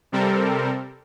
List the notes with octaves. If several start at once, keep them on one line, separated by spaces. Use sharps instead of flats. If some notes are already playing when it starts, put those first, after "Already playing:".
C3 G3 C4 A4 A#4